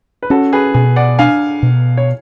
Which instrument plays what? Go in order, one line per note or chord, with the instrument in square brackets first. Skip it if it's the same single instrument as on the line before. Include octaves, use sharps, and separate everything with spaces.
[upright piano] B4
[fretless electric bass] C#4 [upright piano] F#4 A4
[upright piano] G#4 B4
[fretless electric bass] B2 [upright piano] G#4
[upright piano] D5 F#5
[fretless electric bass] D4 [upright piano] F5 G#5
[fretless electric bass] B2
[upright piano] C#5